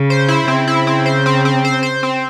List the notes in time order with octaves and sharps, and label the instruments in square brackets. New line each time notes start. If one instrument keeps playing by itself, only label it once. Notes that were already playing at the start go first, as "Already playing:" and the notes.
Already playing: [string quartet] C#3
[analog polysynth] C5
E4
[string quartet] C#3 [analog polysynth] C4
[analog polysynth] E4
C4
C5
C4
C4
C5
C5
C4